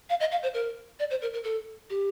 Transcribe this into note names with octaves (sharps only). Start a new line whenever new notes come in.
F5
D#5
F5
C5
A#4
D5
C5
A#4
A#4
A4
G4